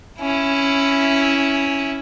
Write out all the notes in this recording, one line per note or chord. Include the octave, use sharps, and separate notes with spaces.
C#4 E4